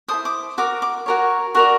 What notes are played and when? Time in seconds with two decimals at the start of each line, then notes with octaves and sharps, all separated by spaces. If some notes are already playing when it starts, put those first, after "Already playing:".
0.08 A4 C5 D#6
0.13 E4
0.25 D6
0.58 F#4 A#4 D6
0.82 D6
1.06 F#4 A#4 C#5
1.55 F#4 A#4 D5 C#6